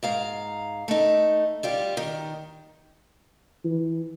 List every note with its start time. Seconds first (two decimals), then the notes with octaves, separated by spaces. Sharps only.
0.03 G#2 F5 A#5
0.88 A3 D#4
1.63 G3 F4 G4
1.97 D#3
3.64 E3